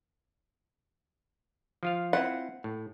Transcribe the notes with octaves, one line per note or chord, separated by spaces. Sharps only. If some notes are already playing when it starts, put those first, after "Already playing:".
F3 F4 F5
C4 E4 F4 F#5
A2